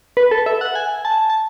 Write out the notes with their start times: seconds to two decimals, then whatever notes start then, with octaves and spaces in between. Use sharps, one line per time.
0.17 B4
0.31 A4
0.46 E5
0.61 F#5
0.75 G#5
1.05 A5
1.30 A5